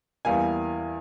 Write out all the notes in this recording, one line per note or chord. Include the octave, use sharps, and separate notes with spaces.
E2 E3 G3 A#3 F5 G#5